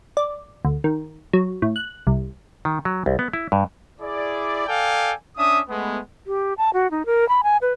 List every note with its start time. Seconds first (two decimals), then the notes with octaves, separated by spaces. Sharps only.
0.17 D5
0.65 D2
0.84 D#3
1.33 F#3
1.62 A2
1.76 F#6
2.07 C2
2.65 D#3
2.85 F#3
3.06 C2
3.19 B3
3.33 E4
3.52 G2
4.01 E4 G#4 D5
4.67 A4 D5 F5 G5 G#5
5.38 C#4 D4 E5 D#6
5.69 G#3 A3 B3
6.27 G4
6.58 A5
6.73 F#4
6.91 D#4
7.06 A#4
7.29 B5
7.43 G#5
7.62 B4